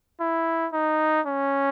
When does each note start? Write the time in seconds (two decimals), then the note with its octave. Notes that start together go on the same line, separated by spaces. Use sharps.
0.20 E4
0.73 D#4
1.27 C#4